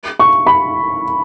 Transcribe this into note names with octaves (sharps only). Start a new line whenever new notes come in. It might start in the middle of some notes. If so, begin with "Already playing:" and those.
C#6
B5